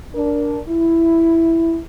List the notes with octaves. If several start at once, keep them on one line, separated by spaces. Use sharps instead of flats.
D4 A#4
E4